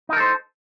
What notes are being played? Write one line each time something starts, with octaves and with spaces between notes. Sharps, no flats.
D#4 A4 A#4 C5